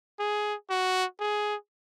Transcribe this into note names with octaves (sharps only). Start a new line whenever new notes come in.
G#4
F#4
G#4